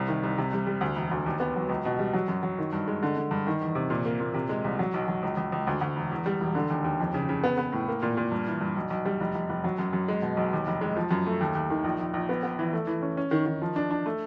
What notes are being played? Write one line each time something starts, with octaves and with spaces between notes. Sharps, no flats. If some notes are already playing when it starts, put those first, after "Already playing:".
Already playing: C2 C3
D#3
C2
C3
G3
G3
D2
E1
D2
D#2
B3
F#3
C#2
B2
G3
F#3
F#2
F#3
D#3
G2
G#3
D3
D3
G2
D#3
E2
C3
A#2
A#3
A#2
C3
G#3
C2
F#3
B1
F#3
C#2
C#2
C#2
D2
D2
E1
E2
G3
E1
D3
D#2
D#2
F2
C#3
C#3
B3
B3
A2
A#3
A#2
A#2
G2
E3
G2
B1
B1
G3
F1
F1
F1
F#3
F#2
F#2
G#3
B2
B1
D#2
F1
G#3
F3
F#2
A3
D#2
D#2
D#3
A#1
A#1
A#1
B3
B3
E3
A3
E3
C#4
C#4
D#3
D#3
F3
D4
D4
A3